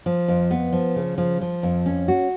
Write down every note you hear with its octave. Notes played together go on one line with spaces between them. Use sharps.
F3
F2
B3
F3
C#3
F3
F3
F2
C#4
F#4